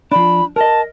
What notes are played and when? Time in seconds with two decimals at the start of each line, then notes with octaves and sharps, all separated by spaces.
0.12 F3 D4 B5
0.56 A#4 D#5 A5